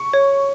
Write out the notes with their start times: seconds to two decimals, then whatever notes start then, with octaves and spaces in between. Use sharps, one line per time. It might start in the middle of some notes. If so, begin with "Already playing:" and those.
Already playing: C#6
0.14 C#5